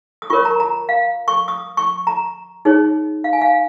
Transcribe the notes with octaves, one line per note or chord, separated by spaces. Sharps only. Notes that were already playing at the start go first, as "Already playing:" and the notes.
D#6
F4 A#4 C#5 C#6
A#5
A#5
F5
C#6
D#6
C#6
A#5
D#4 G#4 C#5
F5
G#5
F5